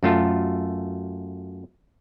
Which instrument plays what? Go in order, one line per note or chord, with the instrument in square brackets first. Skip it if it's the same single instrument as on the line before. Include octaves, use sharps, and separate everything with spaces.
[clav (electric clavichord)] F#2 A3 F4 A4